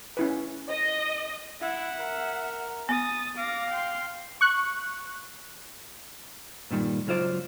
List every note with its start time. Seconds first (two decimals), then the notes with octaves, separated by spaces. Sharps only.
0.17 C#4 E4 B4
0.70 D#5
1.61 E4 E5 F#5
1.99 A#4
2.89 B3 D#6 A6
3.38 F5 D6 A#6
3.71 G5 C6
4.41 C#6 F#6
6.70 G2 A#2 D#3 G3
7.07 C#2 F#3 F4 C5 D5